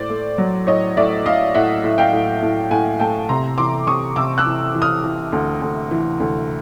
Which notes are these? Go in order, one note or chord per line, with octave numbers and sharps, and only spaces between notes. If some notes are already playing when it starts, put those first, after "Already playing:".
Already playing: A2 C5 D5
A3
F#3
A2 C#5 D#5
A2 D5 E5
A2 D#5 F5
A2 E5 F#5
A2
F5 G5
A2
A2
A2 F#5 G#5
A3 G5 A5
C3 A#5 C6
E3 C6 D6
C3 C#6 D#6
C3 D6 E6
E6 F#6
E3
E3
D#6 F6
E3
D2
D2
E3
D2